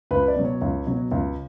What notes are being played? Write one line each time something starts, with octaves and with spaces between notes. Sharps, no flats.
C#2 B4
D5
B2 F#3
C#5
C#2
B2 F#3
C#2